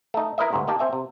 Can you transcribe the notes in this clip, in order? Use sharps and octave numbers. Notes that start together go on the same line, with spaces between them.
A3 D#4
E4 A#4 B4 D#5 E5
G1 D2 G#2
A#3 D#4 G4 A5
C4 E5 G#5
C3